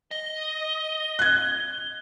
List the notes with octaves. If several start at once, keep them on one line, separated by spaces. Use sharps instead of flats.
D#5 G7
F#6 G#6